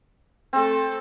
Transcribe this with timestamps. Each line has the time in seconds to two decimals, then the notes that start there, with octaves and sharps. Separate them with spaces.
0.53 A3 C4 A4